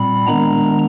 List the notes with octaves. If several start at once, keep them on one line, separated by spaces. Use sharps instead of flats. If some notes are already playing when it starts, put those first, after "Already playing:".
Already playing: A#2 G3 C4 B5
D#3 G#3 B3 D4 A#5